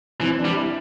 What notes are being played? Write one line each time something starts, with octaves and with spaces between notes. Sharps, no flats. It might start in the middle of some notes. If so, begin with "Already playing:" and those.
E3 C4
D4
G3
E4